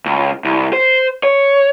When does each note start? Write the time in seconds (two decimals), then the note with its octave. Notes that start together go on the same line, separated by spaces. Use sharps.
0.06 C#2
0.45 C2
0.73 C5
1.23 C#5